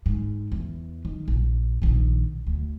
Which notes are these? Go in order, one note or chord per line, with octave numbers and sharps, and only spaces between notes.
G#2
E2
D#3
A#1
A#1 D#3
D2